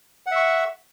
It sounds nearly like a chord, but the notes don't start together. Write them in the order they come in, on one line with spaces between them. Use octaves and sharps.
F#5 E5 C#6